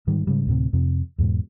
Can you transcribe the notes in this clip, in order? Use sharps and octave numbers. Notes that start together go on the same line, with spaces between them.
G#2 D#3 G3
G#2 C#3 G3
D2 A2 C3
F2 C3
E2 G#2 B2